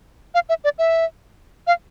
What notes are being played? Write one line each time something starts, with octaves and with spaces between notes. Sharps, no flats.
F5
E5
D5
E5
F5